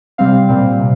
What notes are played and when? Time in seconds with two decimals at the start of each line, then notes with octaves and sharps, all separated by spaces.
0.18 C3 G3 C4 F5
0.49 A#2 G3 C4
0.79 C3